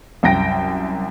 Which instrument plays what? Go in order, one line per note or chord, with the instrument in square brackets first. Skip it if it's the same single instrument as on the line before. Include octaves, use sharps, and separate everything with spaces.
[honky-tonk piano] C2 F#2 G5 A#6 D7